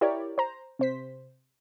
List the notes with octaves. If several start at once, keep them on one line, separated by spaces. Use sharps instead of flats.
E4 G4 A#4 C#5 D5
C5 A#5
C3 C5 B6